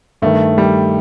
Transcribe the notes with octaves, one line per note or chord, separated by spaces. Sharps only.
G2 D#3 A3
G3